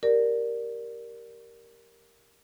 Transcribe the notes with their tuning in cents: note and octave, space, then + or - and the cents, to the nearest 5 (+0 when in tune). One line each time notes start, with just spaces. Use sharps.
G4 +0 A#4 +0 D5 +0